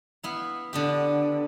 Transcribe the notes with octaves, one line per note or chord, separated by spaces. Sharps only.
B3 E4 F5
D3 B3 G4